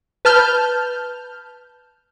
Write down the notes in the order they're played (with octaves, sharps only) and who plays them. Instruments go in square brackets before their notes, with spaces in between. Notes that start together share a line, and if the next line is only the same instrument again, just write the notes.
[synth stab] B4 A5 F6 G6